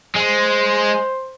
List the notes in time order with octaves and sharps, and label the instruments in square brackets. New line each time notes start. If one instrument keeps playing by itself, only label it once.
[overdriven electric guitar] G#3 [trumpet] C5